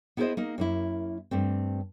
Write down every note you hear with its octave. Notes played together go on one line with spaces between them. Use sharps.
B3 E4 G#4 A#4 C5 D#5
A#3 D#4
F#2 A#3 E4
G2 A3 C4